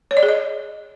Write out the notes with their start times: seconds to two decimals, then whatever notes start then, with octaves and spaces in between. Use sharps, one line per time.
0.11 C#5
0.17 D5
0.23 G#4
0.29 D#5